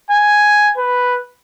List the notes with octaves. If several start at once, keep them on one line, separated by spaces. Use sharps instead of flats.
G#5
B4